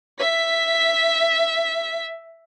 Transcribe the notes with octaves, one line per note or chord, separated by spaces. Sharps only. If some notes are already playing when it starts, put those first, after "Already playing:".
E5 B6